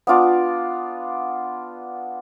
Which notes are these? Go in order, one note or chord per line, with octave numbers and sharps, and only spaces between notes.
B3 D4 F4 D5